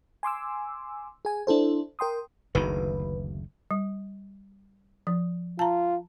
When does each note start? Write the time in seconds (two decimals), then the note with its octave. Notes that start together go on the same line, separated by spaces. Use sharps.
0.23 G#5 C6 D6 E6
1.25 G#4 G#5
1.47 D4 E4 A4 C5
1.99 A#4 G5 C6 D#6
2.55 F#1 D2 D#3 B4
3.71 G3
5.07 F3
5.59 F4 A5 A#5